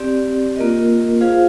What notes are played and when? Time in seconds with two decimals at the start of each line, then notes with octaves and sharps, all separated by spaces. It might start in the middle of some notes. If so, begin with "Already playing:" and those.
Already playing: C4 G4 D5
0.56 A#3 F4 A#4 D#5
1.21 F4 G#4 C5 F5